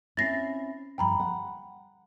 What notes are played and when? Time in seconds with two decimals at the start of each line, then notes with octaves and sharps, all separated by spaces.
0.17 C4 C#4 E4 A6 A#6 C7
0.98 D2 G2 F3 G5 A#5 B5
1.20 F#5